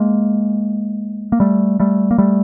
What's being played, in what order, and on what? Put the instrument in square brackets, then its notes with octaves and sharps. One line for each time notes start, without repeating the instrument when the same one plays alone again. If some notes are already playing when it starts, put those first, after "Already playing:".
Already playing: [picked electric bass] G#3 A#3
A#3
G3 A3
G3 A3
A#3
G3 A3